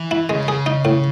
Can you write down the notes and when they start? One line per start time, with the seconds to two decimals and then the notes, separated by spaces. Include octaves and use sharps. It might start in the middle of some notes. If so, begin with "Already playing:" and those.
Already playing: E3
0.11 E4
0.29 C#3 G#3
0.48 G#4
0.66 D#4
0.85 A2